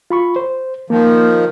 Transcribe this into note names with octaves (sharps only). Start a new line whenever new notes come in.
F4 B5 C#6
C5
D#3 F3 A#3